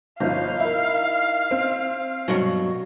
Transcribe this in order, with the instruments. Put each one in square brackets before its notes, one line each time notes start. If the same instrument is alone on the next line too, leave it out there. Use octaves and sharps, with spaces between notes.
[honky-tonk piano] G1 F3 [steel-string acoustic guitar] D#4 [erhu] F5
[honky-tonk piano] E4 A#4
C4
[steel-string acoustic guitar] G2 B2 F#3